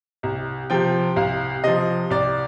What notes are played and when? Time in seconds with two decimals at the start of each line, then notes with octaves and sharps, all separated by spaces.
0.23 C2
0.70 C3 F3 G5
1.16 C2 F5
1.64 C3 F3 D#5
2.10 C2 D5